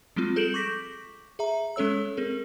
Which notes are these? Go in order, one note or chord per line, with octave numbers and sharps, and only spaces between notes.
F3 G3 G#3 C4 F4
G#4 A4 G6 D7 E7 F#7
C#6 D6 G6 A#6 B6
G#4 E5 A#5
G#3 C#4 A4 C#5 E6
C4 G#4 A#4